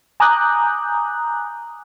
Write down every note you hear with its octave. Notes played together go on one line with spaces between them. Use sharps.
G#5 A#5 D6 D#6 F#6 G6